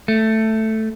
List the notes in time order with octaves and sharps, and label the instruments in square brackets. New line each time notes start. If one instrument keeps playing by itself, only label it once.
[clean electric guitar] A3